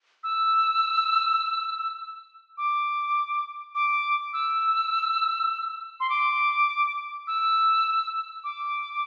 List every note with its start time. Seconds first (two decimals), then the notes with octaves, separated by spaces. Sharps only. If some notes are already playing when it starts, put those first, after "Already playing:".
0.24 E6
2.58 D6
3.75 D6
4.33 E6
6.00 C6
6.10 D6
7.27 E6
8.44 D6